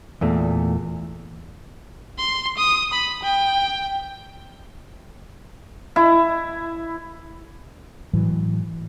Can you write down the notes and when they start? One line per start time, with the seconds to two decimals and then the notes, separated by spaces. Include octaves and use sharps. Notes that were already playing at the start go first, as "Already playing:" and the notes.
0.21 E2 A#2 A3
2.18 C6
2.58 D#6
2.93 B5
3.24 G5
5.96 E4
8.13 A2 E3 F#3